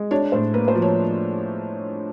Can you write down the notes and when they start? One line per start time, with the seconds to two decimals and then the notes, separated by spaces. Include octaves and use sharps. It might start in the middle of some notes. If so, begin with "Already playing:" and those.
Already playing: G#3
0.11 D4 C#5
0.32 A2 C5
0.54 A#3 B4
0.68 C5
0.75 F3
0.82 C#5